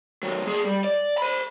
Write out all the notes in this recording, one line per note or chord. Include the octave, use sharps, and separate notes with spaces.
D#3 F#3
A#3 G#4
G3
D5
C5 B5